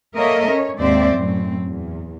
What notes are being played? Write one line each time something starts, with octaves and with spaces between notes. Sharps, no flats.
A#3 A4 A#4 C#5 D#5 E5
C#4 C#5
D#2 G#2 C4 C5 D5 E5
F#2 A2 C4
E2